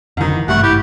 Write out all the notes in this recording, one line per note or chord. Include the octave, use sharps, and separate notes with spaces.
F1 C2 D3 D#3 F#3
E3
G#1 G2 C3 G3 A3 F#5 C#6
E4 G4